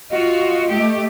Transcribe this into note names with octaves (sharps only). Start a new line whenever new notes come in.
F4 F#4 D#5
A3 G4